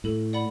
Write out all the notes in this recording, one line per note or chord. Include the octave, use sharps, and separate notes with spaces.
A2 A4
D5 F#5 B5